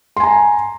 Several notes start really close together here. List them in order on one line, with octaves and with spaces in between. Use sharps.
C6 G#5 A#5